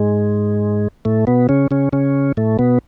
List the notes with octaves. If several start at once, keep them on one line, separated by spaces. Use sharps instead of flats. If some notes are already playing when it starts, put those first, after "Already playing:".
Already playing: G#2 G#3
A2 A3
B2 B3
C#3 C#4
C#3 C#4
C#3 C#4
A2 A3
B2 B3